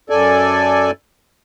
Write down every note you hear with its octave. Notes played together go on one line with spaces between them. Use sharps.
F#2 A4 D5 G#5